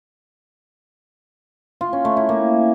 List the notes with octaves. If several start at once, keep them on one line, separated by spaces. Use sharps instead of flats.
F4
C#4
A3
E4
A#3